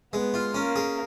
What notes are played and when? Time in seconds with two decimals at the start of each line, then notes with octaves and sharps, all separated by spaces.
0.13 G#3 B3
0.34 F4
0.55 A#3 C#4
0.76 G#4